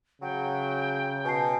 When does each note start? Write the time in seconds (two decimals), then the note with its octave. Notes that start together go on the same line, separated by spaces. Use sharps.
0.22 C#3 F#3 G5
1.24 B2 G#5 A5 C7